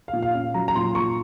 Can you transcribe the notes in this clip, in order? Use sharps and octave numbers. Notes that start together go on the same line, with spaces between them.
F5
A#2
F5
C#4
F#3 A#5
A#5
A#2 C6
A#2 C#6